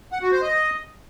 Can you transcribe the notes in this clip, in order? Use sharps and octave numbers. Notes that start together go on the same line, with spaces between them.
F#5
F#4
C5
D#5